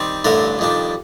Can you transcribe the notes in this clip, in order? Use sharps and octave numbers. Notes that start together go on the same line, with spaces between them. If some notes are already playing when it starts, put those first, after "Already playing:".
Already playing: D#3 G3 C4
A1 G2 D3 A3 D4 A#4
F2 D#3 G3 D4